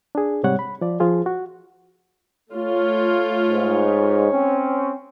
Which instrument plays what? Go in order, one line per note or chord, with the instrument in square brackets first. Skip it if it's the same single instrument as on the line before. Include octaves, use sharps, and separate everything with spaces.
[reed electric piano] D4 G#4
G#2 C3 G3 C#5 F#5
B5
F3 D5
F3 F4 G#4
F#4
[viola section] A3 F4 [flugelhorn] C#5
[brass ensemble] G#2
C4 C#4